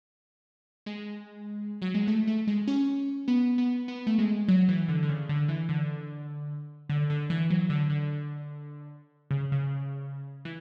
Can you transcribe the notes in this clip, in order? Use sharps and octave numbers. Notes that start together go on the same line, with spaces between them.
G#3
F#3
G#3
A3
A3
G#3
C#4
B3
B3
B3
A3
G#3
F#3
E3
D3
D3
C#3
D3
E3
D3
D3
D3
E3
F#3
D3
D3
C#3
C#3
E3